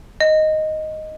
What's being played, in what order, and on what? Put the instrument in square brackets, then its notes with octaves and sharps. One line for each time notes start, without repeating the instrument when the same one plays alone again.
[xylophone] D#5